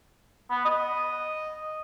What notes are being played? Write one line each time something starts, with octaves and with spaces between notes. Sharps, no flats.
B3
D#5